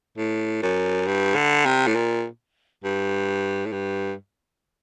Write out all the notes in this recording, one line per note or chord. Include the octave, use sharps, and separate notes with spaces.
A2
F#2
G2
D3
C3
A2
A#2
G2
A2
G2